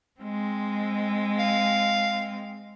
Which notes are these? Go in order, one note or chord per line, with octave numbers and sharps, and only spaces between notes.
G#3 C4
F5